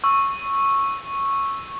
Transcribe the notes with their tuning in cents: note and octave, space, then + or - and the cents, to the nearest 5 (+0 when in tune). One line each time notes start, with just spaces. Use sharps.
C#6 -10 E6 +0